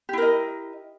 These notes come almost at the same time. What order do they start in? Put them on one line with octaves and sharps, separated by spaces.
G4 E4 A#4 D#5